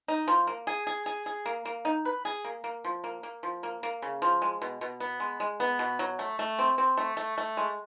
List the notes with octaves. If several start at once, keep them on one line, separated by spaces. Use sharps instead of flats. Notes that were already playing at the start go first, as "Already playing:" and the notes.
D#4
F3
A#3
G#4
G#4
G#4
G#4
A#3
A#3
D#4
B4
G#4
A#3
A#3
F3
A#3
A#3
F3
A#3
A#3
C#3
F3
G#3
B2
B2
B3
G#3
G#3
B3
B2
F#3
A3
A3
C4
C4
A3
A3
A3
G#3